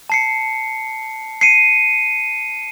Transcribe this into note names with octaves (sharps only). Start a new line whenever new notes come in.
A5 C7 C#7
C7 C#7 D#7